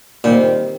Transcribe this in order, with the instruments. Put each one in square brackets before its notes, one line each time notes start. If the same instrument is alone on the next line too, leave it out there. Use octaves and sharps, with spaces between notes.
[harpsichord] A#2 [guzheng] D#3 G3 C4